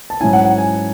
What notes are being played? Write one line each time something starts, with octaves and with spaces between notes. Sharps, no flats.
A5
G#2 F#3 C#4 E4 G#5
F#5
F#5
G#5